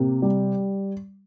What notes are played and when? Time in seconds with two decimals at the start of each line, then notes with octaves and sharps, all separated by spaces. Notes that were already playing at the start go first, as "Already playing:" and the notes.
Already playing: C3 A#3
0.22 G3